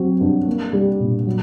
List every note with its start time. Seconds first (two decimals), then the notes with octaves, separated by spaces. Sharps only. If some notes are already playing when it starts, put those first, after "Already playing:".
Already playing: F#3 C4
0.21 G2
0.46 A#3
0.73 G3
1.00 A#2
1.27 F#3